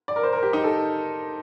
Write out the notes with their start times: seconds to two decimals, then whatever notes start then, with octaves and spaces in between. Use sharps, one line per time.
0.08 D5
0.16 A#4
0.23 C5
0.33 A#4
0.43 G4
0.53 D#4
0.64 A4